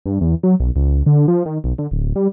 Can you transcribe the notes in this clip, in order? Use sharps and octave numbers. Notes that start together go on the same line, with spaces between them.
G2
E2
F#3
B1
C#2
D3
F3
D#3
B1
D3
D1
G3